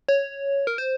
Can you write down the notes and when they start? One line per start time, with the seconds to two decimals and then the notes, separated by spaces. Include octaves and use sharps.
0.09 C#5
0.67 A#4
0.78 C5